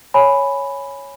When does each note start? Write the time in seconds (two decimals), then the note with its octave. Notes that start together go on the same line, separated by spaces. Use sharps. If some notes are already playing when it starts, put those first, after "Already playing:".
0.14 C#5 G#5 B5